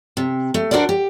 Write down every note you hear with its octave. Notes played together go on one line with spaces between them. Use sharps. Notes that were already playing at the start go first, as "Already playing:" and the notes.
C3
A3
D4 F#4 A#4 C5 D5
G4